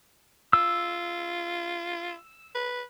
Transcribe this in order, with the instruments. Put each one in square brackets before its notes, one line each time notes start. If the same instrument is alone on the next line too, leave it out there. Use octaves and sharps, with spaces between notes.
[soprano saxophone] F4 [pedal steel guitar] E6
[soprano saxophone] B4